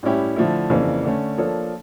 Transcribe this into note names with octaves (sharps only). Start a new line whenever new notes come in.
A2 G3 C#4 E4 G4
D3 F3 A3 E4
F2 C#3 E3 A#3 D4
D3 A3 C#4
F3 A#3 D4 A4 C#5